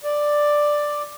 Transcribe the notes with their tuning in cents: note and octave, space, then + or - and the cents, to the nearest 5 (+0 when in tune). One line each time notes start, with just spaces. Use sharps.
D5 +5